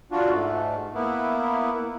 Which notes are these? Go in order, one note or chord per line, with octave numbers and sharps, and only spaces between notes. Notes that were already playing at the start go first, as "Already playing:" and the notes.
D4 F4 F#4
G#2 A3
A#3 B3 E4